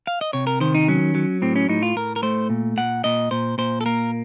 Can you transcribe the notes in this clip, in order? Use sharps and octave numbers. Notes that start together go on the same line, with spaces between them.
F5
D#5
C3 C#5
A#4
D#3 C5
D#4
F#3 C#4
F#3
A2 C4
C#4
A2 D#4
F4
A2 A#4
A#4
A3 C5
A#2
A#2 F#5
A#2 D#5
A#2 C5
A#2 C5
A4
A#3 A#4